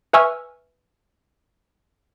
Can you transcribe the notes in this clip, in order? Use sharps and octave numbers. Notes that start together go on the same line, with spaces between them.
B4 E5 G#5 C#6 E6 F6